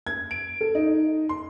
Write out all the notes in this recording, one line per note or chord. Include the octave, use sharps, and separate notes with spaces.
G#6
D7
A4
D#4
C6